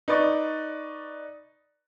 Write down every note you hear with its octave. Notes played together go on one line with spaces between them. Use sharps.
D#4 B4 D5 C#6